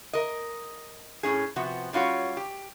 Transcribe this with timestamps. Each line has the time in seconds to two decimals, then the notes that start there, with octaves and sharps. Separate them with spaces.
0.13 A#4 D#5
1.23 A2 C#4 G#4
1.56 C3 F3 B3 F#4
1.93 G3 C#4 F4 F#4 C#5
2.37 G4